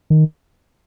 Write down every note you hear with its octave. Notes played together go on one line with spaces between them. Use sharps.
D#3